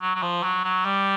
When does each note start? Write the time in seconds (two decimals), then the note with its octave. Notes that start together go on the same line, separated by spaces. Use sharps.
0.02 F#3
0.15 F#3
0.23 F3
0.44 F#3
0.64 F#3
0.85 G3